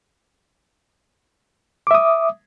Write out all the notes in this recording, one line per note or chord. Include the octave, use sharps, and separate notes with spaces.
E5 D6 D#6